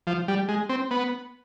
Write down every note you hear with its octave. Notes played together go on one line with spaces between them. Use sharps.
F3
G3
G#3
C4
B3